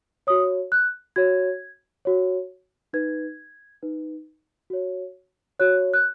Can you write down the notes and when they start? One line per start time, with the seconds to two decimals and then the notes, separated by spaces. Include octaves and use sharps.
0.27 F#4 C#5 D#6
0.72 F#6
1.16 F#4 C#5 G#6
2.05 F#4 C#5
2.93 D#4 B4 G#6
3.83 D#4 B4
4.70 F#4 C#5
5.60 F#4 C#5 F#6
5.94 F#6